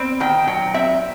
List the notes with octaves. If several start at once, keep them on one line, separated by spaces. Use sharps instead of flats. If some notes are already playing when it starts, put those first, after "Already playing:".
Already playing: C4
D#3 G5
F#3 G5
C4 E5